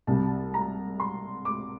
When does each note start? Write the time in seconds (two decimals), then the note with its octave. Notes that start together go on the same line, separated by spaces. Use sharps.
0.07 C2 C3 G3 A5
0.54 A#5
1.00 C6
1.45 D6